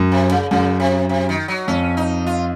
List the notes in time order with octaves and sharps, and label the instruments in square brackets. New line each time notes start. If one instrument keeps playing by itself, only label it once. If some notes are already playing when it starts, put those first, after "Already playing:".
Already playing: [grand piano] F#2
[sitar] C3
C#3
[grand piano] F#2 [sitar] C#3
[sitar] C3
C3
D#3
F#3
[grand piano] F2 [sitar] C#4
[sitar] D#4
F4